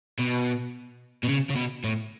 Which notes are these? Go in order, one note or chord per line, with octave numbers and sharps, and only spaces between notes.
B2
B2
C#3
C#3
B2
A2